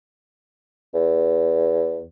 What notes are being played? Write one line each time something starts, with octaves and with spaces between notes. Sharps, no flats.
E2